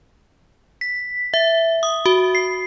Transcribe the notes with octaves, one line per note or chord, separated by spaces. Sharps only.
B6
E5
D#6
F#4
C7